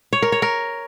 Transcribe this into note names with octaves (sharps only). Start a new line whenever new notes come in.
C#5
A#4
C#5
A#4